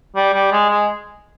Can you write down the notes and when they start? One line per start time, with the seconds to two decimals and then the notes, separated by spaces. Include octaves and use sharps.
0.15 G3
0.34 G3
0.52 G#3
0.70 G#3